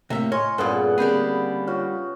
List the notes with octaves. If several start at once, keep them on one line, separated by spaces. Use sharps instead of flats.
A2 C3 A#3 E5
C#5 D#5 G#5 C6 F6
G2 A#2 C#3 B3 A4 B4 F#5 D#6
D3 G3 A#3 C4 G#4 B5 G6
F4 F#4 C#5 F6